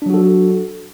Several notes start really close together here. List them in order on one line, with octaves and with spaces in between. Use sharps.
D4 F#3 F#4 A4